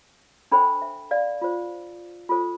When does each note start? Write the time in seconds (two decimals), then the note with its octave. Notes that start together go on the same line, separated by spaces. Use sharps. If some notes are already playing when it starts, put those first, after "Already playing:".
0.52 D4 A4 C5 G5 B5
0.82 E5
1.11 D5 F5
1.41 F4 C5
2.29 F4 A4 C5